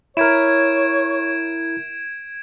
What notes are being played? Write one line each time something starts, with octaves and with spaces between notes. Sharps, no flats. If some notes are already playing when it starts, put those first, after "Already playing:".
E4 A#4 C#5 G#6 D7 E7